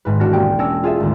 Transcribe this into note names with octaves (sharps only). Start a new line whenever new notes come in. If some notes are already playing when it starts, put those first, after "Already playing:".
G#1 G#2 B4
E1 D4 F#4 F6 A#6
A#3 C#4 G4 G5
C#4 D4 E6 A#6
F4 G#4 A4 E5
G#1 D2